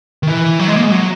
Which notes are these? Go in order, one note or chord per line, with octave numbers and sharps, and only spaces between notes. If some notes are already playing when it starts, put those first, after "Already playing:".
D#3
E3
F#3
G#3
A#3
G#3
F#3